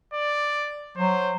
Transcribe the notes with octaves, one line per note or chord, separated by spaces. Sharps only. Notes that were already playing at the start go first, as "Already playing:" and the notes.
D5
F#3 C5